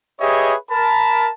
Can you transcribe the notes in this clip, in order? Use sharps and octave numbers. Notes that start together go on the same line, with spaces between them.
G4 G#4 B4 C#5 D#5 E5
A#4 A5 B5